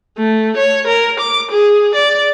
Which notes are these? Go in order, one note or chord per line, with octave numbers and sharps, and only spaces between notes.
A3
C#5
A#4
D6
G#4
D5